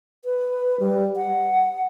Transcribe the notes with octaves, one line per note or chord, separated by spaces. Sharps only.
B4
G3
F#5